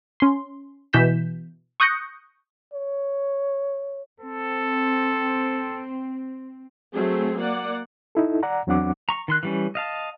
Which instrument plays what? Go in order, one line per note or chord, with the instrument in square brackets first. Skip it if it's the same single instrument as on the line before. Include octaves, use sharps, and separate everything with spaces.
[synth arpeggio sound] C#4 C6
B2 E3 G6 B6 E7
C#6 D#6 F#6 G6 A#6 C#7
[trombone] C#5
[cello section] C4 [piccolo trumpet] A4
[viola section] F#3 A3 C4 G#4
A#3 D5 F#5
[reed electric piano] D#4 E4 A4
D5 F#5 A#5
E2 F#3 C4 D4 F#5 D6
[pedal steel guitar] A#5 C#6
D#3 C6 F#6
E3 G3 C#4
D#5 F5 A5